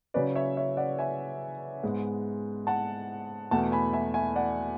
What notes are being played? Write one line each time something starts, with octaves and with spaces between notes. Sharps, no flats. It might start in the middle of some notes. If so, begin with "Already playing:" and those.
C#3 F#3 C#4 B4 D5
C#5 E5
C#5 E5
D5 F#5
E5 G#5
G#2 G#3 B3
F#5 A5
E2 B2 A3 F#5 A5
G#5 B5
E5 G#5
E5 G#5
D5 F#5